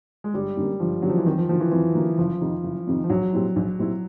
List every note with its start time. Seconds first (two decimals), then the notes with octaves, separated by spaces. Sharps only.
0.24 G#3
0.34 G1 G3
0.57 F#2 D3 G3 A#3
0.80 G1 F3
1.02 F#2 D3 F#3 G3 A#3
1.10 F3
1.18 E3
1.26 F2 D#3
1.38 F3
1.49 D3 F3 F#3 A#3
1.60 E3
1.71 F2 E3
1.95 D3 F#3 A#3
2.18 F#1 F3
2.41 F2 C3 D#3
2.64 F#1
2.87 F2 C3 D#3
3.04 F3
3.10 A#1 F#3
3.33 A#2 G3 C4 E4
3.56 A#1
3.79 A#2 G3 C4 E4